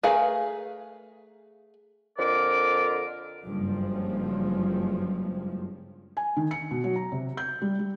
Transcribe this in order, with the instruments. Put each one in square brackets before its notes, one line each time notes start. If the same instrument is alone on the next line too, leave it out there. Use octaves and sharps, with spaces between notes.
[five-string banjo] A3 G#4 A#4 B4 F5
[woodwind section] F2 D3 A#4 D5 D6
[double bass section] F#1 G2 F3 G#3
[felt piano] G#5
D#3
C#7
B2
F#3
A#5
C3
G6
G3
G3